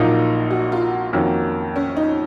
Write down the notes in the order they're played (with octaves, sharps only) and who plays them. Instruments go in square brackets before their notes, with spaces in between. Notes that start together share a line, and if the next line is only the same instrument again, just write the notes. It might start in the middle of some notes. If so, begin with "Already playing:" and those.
Already playing: [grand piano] A#1 A#2 F#3 A#3 D#4 [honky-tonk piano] F4
[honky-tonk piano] F#4
F4
[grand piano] F2 D#3 A#3 C#4 F#4
[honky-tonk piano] C#4
D#4